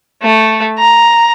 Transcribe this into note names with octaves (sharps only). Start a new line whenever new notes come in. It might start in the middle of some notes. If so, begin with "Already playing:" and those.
A3
A#5